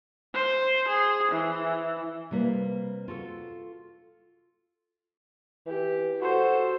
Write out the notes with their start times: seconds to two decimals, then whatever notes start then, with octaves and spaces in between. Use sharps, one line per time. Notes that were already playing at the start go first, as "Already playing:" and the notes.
0.34 C5
0.88 G#4
1.32 E3
2.31 C3 G3 A#3 B4
3.08 F4 F#4 A4
5.67 E3 G4
6.21 F#4 A4 C5